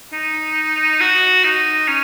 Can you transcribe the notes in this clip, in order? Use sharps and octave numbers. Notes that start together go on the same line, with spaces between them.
D#4
F#4
D#4
C#4